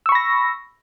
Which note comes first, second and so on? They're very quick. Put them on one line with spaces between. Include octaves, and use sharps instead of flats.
E6 C#6 B5 A#6